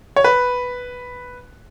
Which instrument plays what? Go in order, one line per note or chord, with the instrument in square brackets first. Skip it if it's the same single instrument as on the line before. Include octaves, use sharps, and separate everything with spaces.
[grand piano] C#5
B4